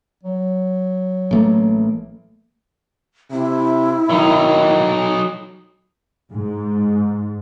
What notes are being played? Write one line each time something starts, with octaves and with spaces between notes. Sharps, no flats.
F#3
A1 A3 A#3
C3 E4
D#3 F#3 D#4
G#2